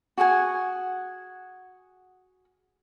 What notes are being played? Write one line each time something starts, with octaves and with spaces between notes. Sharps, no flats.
F#4 G#4 F#5 G#5